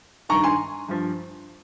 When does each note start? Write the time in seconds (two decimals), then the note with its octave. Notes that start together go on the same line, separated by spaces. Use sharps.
0.29 G2 D#3 A#5 C#6
0.44 G#5 C6
0.88 G2 F3